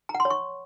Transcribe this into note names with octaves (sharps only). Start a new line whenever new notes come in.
A#5
F#5
C6
C#5
C#6